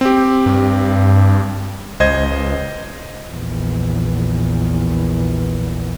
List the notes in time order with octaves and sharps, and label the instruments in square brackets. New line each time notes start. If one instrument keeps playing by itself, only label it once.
[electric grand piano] C4 G4
[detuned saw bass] G2
[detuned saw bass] C#2 [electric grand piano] C5 D#5 G#6
[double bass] A#1 E2